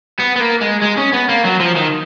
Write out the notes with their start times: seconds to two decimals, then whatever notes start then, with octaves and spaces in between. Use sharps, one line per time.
0.20 B3
0.36 B3
0.40 A#3
0.61 G#3
0.82 G#3
0.98 C#4
1.13 B3
1.29 A#3
1.45 F#3
1.61 F3
1.76 D#3